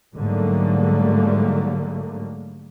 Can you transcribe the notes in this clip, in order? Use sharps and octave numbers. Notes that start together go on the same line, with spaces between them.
G#2 D3 F#3 G3 A3 A#3